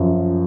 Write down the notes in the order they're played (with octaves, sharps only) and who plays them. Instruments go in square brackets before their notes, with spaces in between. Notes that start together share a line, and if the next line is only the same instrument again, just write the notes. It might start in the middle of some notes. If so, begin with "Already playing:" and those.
Already playing: [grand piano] F#2 F3